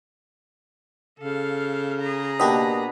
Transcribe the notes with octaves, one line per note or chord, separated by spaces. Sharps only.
C#3 A4 F5
G#4 A#5
B2 A#3 D4 G4 D#5 B5